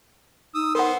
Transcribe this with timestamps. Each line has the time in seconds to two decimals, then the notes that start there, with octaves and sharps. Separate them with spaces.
0.55 D#4 D#6 E6
0.75 B3 A#4 C5 F#5